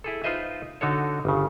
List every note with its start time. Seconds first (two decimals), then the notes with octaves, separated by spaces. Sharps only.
0.04 E4 G#4 A4
0.24 D#4 F4 B4 C5 D#5 E5
0.81 D3 D#4 F#4 A4 C#5
1.25 G1 C#3